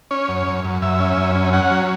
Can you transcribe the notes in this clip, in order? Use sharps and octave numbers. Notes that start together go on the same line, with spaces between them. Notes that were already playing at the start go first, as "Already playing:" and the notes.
C#4 C#5
F#2
F#2
F#2
F#2 E5
C#4
F#2
C#4
C#4 F#5
F#3